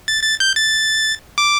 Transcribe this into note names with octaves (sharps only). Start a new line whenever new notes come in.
A6
A6
G6
A6
D6